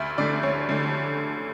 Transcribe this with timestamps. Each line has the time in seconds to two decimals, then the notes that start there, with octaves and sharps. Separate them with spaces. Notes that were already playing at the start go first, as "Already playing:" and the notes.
Already playing: D2 E5
0.18 D3 A3 D5
0.43 D2 C#5
0.69 D3 A3